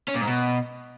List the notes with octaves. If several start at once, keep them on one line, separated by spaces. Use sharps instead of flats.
C#4
A#2
G#2
B2